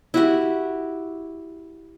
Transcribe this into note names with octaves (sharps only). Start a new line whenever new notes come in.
E4 F#4 G4